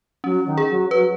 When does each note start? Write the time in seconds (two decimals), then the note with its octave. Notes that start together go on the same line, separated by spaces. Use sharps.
0.24 F#3 C#4
0.46 D#3
0.58 G#4
0.69 F#3
0.91 F#3 B4